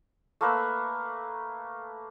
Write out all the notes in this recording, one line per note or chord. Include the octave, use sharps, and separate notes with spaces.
A3 A#3 B4 E5